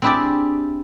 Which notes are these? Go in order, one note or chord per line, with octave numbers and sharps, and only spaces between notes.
C4 D4 E4 G4 G#4 D5